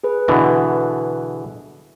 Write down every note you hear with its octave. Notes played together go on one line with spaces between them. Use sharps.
G#4 B4
B2 D3 E3